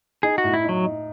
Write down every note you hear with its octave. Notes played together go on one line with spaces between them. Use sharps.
D#4 G#4
F#4
A2
E4
D#4
F#3
D#4